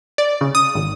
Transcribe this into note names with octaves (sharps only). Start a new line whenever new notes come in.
D5
C#3
D#6
G#1